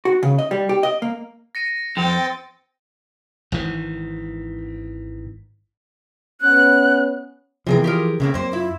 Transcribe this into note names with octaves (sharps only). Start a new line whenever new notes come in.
F#4
C#3
D#5
G3
G4
D#5
A#3
A#6 C#7 D#7
F2 C4 G5 A6
G#1 D#3 E3
B3 C#4 F#6
C3 E3 F3 B3 G#4 A#4
F4 G4 G#4 A#4
A2 C#3 A3 A#3 C4
F#2 A#3 C5
E4 F4